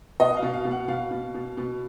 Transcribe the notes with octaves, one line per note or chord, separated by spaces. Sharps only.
B2 D#5
F5
B2
F5
B2
F#5
B2 F5
B2
B2
B2